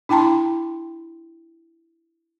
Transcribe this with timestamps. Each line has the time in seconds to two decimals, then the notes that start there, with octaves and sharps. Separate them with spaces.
0.09 D4 E4 G5 A5 A#5 C6